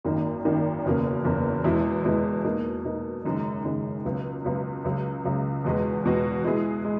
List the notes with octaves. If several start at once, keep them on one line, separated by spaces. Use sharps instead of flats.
G#1 F#2 D#3 A#3 D#4
G#1 F#2 D#3 A#3 D#4
F#1 E2 B2 A#3 C#4
F#1 E2 B2 A#3 C#4
E2 B2 G#3 B3 E4
E2 B2 G#3 B3 E4
B2 A#3 D#4
B2 A#3 D#4
F#1 F#2 D#3 G#3
F#1 F#2 D#3 G#3
C#2 B2 F#3 B3
C#2 B2 F#3 B3
C#2 C#3 F#3
C#2 C#3 F#3
E2 B2 G#3 B3 F#4
E2 B2 G#3 B3 F#4
B2 G#3 B3 E4 G#4
G#3